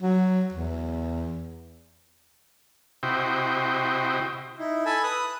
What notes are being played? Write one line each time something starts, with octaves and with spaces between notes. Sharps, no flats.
F#3
E2
C3 E4 F#4 C5 D#5 G5
D#4 E4
A4 G#5 A5 B5
B4 D#6 F#6